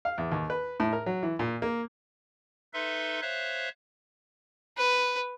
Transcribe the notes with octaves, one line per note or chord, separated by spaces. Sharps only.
F5
E2
D#2
B4
A2
A#4
F#3
E3
A#2
A#3
D#4 A4 B4 E5 C6
C5 C#5 E5 F5 F#6
B4